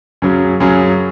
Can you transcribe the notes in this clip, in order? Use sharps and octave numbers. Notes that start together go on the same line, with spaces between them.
F#2 C#3 F#3
F#2 C#3 F#3